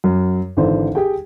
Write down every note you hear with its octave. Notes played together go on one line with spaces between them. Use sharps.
F#2
G#1 D3 E3 C5
G4 G#4 G5